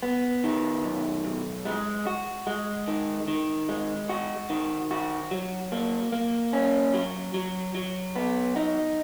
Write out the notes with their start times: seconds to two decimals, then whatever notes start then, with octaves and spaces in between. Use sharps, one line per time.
0.03 B3
0.44 D#3
0.84 B1
1.25 B1
1.65 G#3
2.07 F#4
2.47 G#3
2.88 D#3
3.28 D#3
3.69 G#3
4.09 F#4
4.50 D#3
4.91 F#4
5.31 F#3
5.72 A#3
6.12 A#3
6.53 C#4
6.94 F#3
7.34 F#3
7.75 F#3
8.16 B3
8.56 D#4